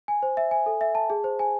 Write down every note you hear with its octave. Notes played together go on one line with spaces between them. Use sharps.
G#5
C5
E5
G#5
A4
E5
A5
G#4
C5
G#5